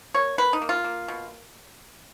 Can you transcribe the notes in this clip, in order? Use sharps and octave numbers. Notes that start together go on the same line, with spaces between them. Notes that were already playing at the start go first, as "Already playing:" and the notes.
A#3 C#5
A#3 B4
D#4
A#3
F4
A#3
B2